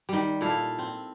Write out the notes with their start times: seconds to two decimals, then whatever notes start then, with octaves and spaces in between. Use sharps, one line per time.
0.09 D#3 G3
0.41 A#2 E4 A4 F5
0.79 C4